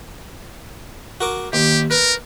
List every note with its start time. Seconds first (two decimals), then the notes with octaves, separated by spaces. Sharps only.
1.21 F#4 A#4 D6
1.53 D#2 G4
1.91 A#4 B4